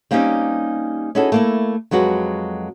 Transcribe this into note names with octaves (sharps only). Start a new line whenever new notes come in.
G3 A#3 C4 C#4 D#4 G4
C#4 D#4 E4 F#4 G#4 A4
A3 A#3 E4
F2 F#3 G#3 F#4 B4